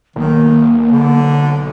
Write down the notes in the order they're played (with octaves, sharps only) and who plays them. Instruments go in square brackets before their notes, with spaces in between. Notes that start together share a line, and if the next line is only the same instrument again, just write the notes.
[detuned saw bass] B1 [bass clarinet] D#3 [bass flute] A#3
[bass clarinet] D3